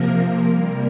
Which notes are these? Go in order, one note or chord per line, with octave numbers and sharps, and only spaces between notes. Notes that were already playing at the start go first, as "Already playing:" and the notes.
Already playing: C3 F3 A#3 A#4
C3 G3 A#3